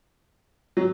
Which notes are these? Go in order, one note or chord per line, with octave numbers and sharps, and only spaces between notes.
F#3